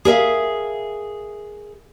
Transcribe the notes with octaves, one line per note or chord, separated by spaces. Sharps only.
G#4 A#4 E5 F5